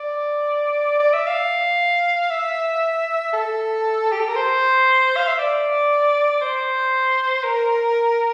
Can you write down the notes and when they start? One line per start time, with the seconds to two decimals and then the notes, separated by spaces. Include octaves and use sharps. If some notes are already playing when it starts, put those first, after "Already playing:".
Already playing: D5
1.00 D5
1.13 E5
1.27 F5
2.30 E5
3.33 A4
4.12 G4
4.20 A4
4.28 A#4
4.36 C5
5.17 F5
5.28 E5
5.39 D5
6.41 C5
7.44 A#4